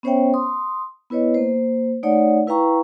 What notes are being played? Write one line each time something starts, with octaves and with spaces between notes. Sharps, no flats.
B3 C#4 C5 C#5 E5 G5
C6 D#6
B3 E4 B4 C#5 D#5
A#3 C5
A3 D#4 C#5 D5 F#5
E4 B4 F5 G5 A#5 C#6